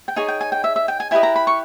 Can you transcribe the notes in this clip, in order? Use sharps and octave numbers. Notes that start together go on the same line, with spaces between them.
G5
D#4 G#4 C#5 G#5
G5
G#5
G5
E5
E5
G5
G#5
E4 G4 B4 D#5 G#5
A#5
B5
C#6